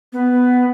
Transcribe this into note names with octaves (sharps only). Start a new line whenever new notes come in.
B3